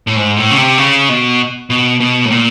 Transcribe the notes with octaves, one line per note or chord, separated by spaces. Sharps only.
A2
G#2
A2
C#3
C3
C#3
B2
B2
B2
A2
A#2